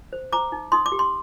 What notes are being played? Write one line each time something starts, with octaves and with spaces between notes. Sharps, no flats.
C5
C5 A#5 D6
D#4
D#4 C6 D#6
D6
G4
C6